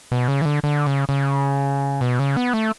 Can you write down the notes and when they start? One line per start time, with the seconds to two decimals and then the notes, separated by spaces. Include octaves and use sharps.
0.12 B2
0.28 C#3
0.42 E3
0.45 D3
0.64 D3
0.87 C#3
1.09 C#3
2.01 B2
2.19 C#3
2.37 B3
2.53 A3